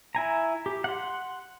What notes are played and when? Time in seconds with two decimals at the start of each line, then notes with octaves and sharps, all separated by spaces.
0.15 E4 G#5 A#5
0.66 G4
0.84 F#5 C6